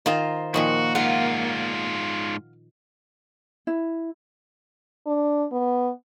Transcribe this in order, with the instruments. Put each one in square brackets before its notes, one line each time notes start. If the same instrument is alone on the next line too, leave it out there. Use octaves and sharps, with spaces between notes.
[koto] D#3 [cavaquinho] F4 C5 A#5
[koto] A#2 D#3 F3 [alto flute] A#3 [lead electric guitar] F#4
[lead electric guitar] G#2 F4 [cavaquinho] F5 F#5
[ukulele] E4
[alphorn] D4
B3